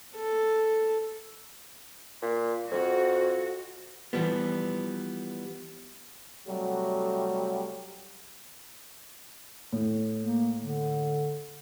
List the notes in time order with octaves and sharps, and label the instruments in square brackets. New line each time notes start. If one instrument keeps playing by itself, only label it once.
[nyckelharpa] A4
[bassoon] A#2
[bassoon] F2 [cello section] F#4
[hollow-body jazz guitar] E3 F3 G3 B3
[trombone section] C3 F#3 G3 A3
[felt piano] A2
[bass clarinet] A#3
D3